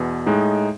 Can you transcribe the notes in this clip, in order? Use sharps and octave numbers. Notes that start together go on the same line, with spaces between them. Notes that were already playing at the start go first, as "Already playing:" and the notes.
Already playing: E2 B2
A2 G#3 D#4